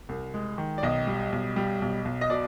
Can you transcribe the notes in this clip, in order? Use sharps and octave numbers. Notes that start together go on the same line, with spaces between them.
C2
G#3
D#3
D5
B1 D#5
G3
B1
G3
B1
B1
D#5
B2 D5